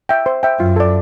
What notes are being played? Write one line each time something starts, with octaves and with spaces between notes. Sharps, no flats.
E5 G5
C5
E5 G5
F#2 F4
A4 D5